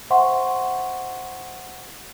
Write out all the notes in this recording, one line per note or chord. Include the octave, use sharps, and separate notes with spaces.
C5 E5 F#5 G#5 C6 C#6